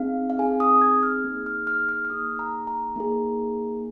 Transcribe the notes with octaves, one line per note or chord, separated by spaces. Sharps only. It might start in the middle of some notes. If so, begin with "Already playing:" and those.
Already playing: C4 D#4 G#4 F5
F5
C4 D#4 G#4 G#5
D#6
G#6
F6
A#3 D#4 G#4
F6
F6
F6
F6
A#3 D#4 G#4 D#6
A#5
A#5
A#3 D#4 G#4